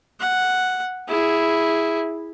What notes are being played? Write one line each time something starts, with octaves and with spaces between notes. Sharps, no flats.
F#5
E4 G#4